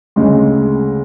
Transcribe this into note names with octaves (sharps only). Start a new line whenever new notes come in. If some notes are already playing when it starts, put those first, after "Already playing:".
D2 C#3 G#3